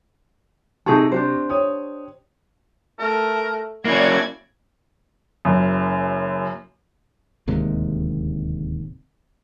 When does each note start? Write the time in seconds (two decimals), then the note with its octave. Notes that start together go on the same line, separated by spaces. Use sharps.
0.86 C3 D#4 G#4 A4 C#6
1.12 D4 G4 C5
1.49 C#5 D#6
2.99 A3 A#4
3.85 A#3 C#4 E4 F#4 D5 G#6
5.45 F#1 F#2
7.47 D1 D#2 C3 G#3